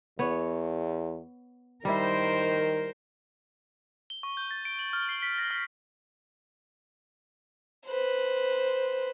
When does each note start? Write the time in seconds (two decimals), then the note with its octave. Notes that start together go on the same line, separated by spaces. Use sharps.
0.19 E2 B3 C#5
1.85 D#3 G3 E4 A#4 C5
4.10 G7
4.23 C#6
4.37 G6
4.51 A6
4.65 D7
4.79 F#7
4.93 F6
5.09 C7
5.23 B6
5.38 A#6
5.51 F6
7.86 B4 C5